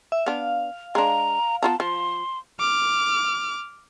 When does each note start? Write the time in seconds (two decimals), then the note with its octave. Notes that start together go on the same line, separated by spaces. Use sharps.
0.12 E5
0.26 B3 D4 F5
0.95 G#3 D4 A#5
1.63 B3 F4 A5 A#5
1.80 F3 C6
2.60 D6 F6